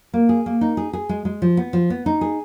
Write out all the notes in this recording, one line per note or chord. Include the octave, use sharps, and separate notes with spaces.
A#3
G#4
A#3
D#4
G#4
G#4
G#3
G#3
F3
B3
F3
B3
D#4
G#4